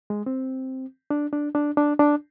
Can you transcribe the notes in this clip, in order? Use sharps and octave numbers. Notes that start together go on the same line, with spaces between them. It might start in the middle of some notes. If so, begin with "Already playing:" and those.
G#3
C4
D4
D4
D4
D4
D4